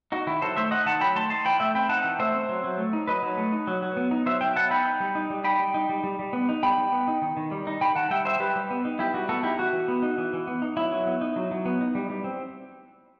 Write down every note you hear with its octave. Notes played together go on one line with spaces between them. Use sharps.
D#4 F#4
D#3 E4
F#3 A4 C5
A3 C5 E5
D#4 D#5 F#5
D#3 F#5 A5
F#3 G5 B5
A3 A5 C6
D#4 A5 C6
E3 G5 B5
A3 E5 G5
C4 G5 B5
D#4 F#5 A5
E3
A3 C5 E5
C4
F#3
F#3
A3
D#4
F#3 B4 D#5
F#3
A3
D#4
F#3
F#3
B3
D#4
F#3 C5 E5
F#3 E5 G5
B3 F#5 A5
D#4 G5 B5
D#4
G3
D#4
G3
D#4 G5 B5
G3
D#4
G3
G3
G3
B3
D#4
G3 G5 B5
G3
B3
D#4
D#3
D#3
G3
D#4
D#3 G5 B5
D#3 F#5 A5
G3 E5 G5
D#4 C5 E5
G3 G4 B4
G3
B3
D#4
G3 E4 G4
G3 F#4
B3 F#4 A4
D#4 E4 G4
E3 F#4
E3
B3
D#4
E3
E3
B3
D#4
F#3 E4
F#3
B3
D#4
F#3
F#3
B3
D#4
G3
G3
C4